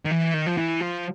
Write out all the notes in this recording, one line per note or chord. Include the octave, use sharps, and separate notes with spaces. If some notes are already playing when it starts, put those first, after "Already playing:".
D#3
E3
D#3
F3
E3
F3